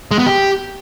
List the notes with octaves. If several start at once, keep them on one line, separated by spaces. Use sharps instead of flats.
G#3
B3
G4